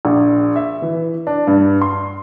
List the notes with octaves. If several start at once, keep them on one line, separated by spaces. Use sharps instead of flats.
A#1
E5
E3
D4
G2
C6